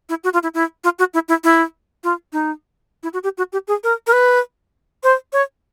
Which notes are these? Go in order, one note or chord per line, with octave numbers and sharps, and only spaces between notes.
E4
F#4
F4
E4
E4
F4
F#4
E4
E4
E4
F4
D#4
E4
F#4
G4
F#4
G4
G#4
A#4
A#4
B4
C5
C#5